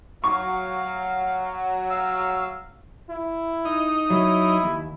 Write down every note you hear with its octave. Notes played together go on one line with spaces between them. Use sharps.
F#3 F5 C#6
F5 E6
E4
D#4
F#3 E4 C#5
D#2